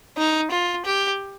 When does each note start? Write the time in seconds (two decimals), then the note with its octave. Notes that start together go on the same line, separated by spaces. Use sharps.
0.17 D#4
0.51 F4
0.85 G4